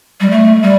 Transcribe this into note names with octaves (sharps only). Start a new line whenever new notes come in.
G3
A3
G3